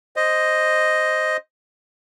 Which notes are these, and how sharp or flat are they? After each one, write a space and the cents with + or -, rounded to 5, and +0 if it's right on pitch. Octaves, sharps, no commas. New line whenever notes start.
C5 +0 D#5 +0